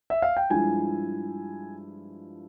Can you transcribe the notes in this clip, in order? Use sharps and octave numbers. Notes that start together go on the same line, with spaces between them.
E5
F5
G5
G2 F3 G#3 E4 G#5